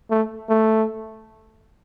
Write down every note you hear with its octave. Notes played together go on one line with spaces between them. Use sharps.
A3
A3